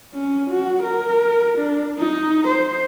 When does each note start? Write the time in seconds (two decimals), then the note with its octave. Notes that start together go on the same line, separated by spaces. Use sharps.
0.14 C#4
0.51 F#4
0.83 A#4
1.58 D4
1.99 D#4
2.48 C5